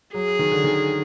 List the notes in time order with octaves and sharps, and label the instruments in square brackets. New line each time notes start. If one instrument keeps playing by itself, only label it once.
[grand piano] F#3 [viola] G#4
[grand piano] D#3
D3
D#3